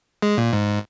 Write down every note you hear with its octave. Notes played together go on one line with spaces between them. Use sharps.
G#3
A#2
G#2